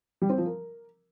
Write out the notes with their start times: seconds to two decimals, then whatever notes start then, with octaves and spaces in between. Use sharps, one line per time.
0.22 G3
0.30 C4
0.38 F3
0.46 A#4